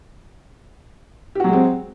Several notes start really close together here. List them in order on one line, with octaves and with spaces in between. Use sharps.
G4 F#4 F#3 G#3 C4